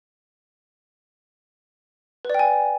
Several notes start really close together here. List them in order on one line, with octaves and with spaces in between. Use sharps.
B4 D5 G5 G#5